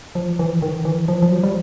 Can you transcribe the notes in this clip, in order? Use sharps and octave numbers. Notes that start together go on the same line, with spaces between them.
F3
E3
D#3
E3
F3
F3
F#3
G3